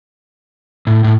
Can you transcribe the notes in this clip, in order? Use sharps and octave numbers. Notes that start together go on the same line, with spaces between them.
A2
A2